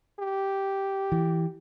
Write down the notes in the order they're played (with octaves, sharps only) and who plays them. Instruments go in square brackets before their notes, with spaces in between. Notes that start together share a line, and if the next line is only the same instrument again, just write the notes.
[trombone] G4
[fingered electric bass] E3